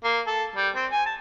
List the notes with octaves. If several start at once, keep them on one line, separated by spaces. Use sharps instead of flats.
A#3
A4
G3
C4
G#5
A5